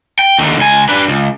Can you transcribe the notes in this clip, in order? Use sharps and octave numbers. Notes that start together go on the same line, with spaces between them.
G5
D#2 D3
C#2 G#5
D4 B4
C#2